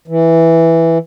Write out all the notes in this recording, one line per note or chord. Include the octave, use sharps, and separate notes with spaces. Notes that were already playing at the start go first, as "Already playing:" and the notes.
E3